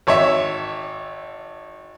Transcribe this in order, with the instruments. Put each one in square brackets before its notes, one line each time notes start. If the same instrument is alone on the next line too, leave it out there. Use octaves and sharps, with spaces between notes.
[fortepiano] G#1 C#5 E5